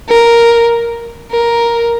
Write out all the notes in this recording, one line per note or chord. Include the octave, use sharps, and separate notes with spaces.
A#4
A#4